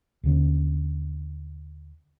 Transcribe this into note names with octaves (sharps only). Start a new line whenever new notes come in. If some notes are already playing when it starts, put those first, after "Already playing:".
D#2 D3 C#4